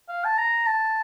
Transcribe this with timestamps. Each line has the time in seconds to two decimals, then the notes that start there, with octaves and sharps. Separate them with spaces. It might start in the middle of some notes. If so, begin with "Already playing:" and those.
0.09 F5
0.24 A5
0.38 A#5
0.66 A5